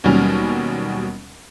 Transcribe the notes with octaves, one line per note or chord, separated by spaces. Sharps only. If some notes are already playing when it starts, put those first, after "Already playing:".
D#2 B2 F#3 G3 C#4 F6